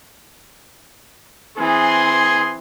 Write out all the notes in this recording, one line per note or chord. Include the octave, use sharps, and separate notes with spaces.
E3 C4 G#4 C6